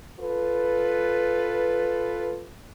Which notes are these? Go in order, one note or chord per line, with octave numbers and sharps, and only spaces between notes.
F4 A4 B4